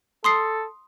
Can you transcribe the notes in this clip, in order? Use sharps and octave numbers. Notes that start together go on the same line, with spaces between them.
A4 C6 D#6 C7